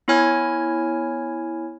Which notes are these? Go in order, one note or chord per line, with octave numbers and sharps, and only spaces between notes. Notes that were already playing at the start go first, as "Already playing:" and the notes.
B3 E4 C#5 G#5 F6 G#6